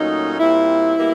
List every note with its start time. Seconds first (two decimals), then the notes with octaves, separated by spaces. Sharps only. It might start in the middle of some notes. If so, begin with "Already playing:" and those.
Already playing: A#2 F#3 A3 C#4 D#4
0.39 A#2 G3 C4 E4
0.96 B2 G3 A#3